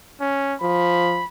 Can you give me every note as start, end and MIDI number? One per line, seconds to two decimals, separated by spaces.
0.20 0.55 61
0.61 1.21 53
0.61 1.26 83